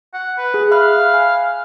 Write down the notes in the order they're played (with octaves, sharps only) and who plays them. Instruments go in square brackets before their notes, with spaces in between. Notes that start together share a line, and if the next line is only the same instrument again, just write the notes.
[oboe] F#5
B4
[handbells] G#4
[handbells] E5 B5 F#6 [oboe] F5
[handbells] G#5